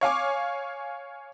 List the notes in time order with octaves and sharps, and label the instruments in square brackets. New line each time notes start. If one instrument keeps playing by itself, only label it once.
[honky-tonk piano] C#5 F5 G#5 D6